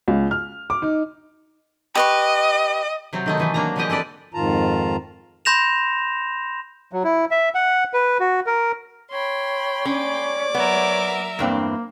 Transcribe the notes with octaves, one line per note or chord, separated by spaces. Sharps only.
C#2
F6
D6
D#4
G4 B4 D#5 C#6
C3 F#3 C4
D#3 A3 D#4
D#3 E3 A3
F#3 A#3 D4 A#5
D3 E3 F3 G#3 G4 D#5
C4 A4 B4 D5 A5
F2 G#2 D#3 F4 A5 A#5
B5 C6 G6 A#6 E7 F7
F#3
E4
E5
F#5
B4
F#4
A#4
C#5 G5 B5 C6
C#4 D5 D6
F#3 B3 A#4 E5
E2 G2 A#3 C4